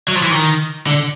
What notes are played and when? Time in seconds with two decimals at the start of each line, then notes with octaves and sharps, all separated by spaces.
0.08 F#3
0.15 F3
0.23 E3
0.31 D#3
0.87 D3